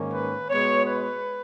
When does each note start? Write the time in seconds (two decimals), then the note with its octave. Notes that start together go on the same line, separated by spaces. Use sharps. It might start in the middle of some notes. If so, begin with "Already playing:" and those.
Already playing: G#2 D#3 A#3 C#4
0.13 B4
0.50 B2 G#3 B3 C#5
0.85 B4